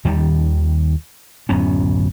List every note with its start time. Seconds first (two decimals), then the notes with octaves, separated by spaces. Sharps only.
0.05 D#2 D#3 G3
1.49 D1 F#2 B3 C#4